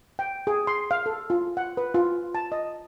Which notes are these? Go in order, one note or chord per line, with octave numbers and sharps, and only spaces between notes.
G5
G#4
C6
F5
A4
F4
F#5
B4
F4
A5
D#5